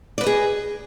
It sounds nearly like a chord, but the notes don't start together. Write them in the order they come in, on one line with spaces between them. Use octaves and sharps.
D5 B4 D#5 G#4